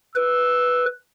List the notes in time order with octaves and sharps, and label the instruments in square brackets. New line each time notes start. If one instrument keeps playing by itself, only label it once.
[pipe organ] B4 [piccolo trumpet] E6